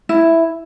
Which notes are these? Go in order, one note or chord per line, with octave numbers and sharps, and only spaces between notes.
E4